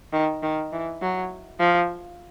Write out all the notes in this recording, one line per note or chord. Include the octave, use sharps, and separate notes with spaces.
D#3
D#3
E3
F#3
F3